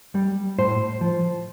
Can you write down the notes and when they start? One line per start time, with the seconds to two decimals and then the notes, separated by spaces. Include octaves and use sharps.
0.15 G3
0.58 A2 C5
1.01 F3